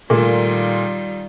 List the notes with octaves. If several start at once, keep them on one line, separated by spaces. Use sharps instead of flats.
A#2 D#3 G3 A3 A#3 F4